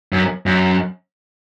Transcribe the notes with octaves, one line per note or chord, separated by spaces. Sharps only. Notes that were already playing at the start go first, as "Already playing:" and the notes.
F#2
F#2